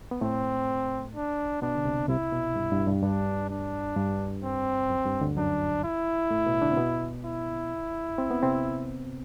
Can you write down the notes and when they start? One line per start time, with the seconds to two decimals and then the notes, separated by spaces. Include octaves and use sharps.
0.11 B3
0.21 A2 A3 C4
1.15 D4
1.62 B2 B3 D4
1.75 D3
1.85 C2 C3
2.09 C2 C3 E4
2.32 B2
2.56 G2
2.72 G2
2.87 G2
3.02 G2 D4
3.49 D4
3.96 G2
4.43 C4
4.90 F#2
5.06 G2
5.21 D2 D3
5.37 F#2 F#3 D4
5.84 E4
6.31 A2 A3
6.46 B2 B3
6.62 D3 D4
6.72 C4
6.77 B2 B3
7.24 E4
8.18 C4
8.31 B3
8.43 C3 C4